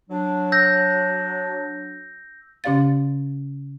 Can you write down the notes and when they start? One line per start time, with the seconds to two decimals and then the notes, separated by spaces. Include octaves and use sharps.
0.10 F#3 D4
0.52 E6 G6 A#6
2.64 C#3 C#4 G4 D5 F5 A6